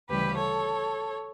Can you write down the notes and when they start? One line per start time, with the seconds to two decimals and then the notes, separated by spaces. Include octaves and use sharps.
0.09 D2 C#3 E3 G3 G4 B4
0.37 A4 C#5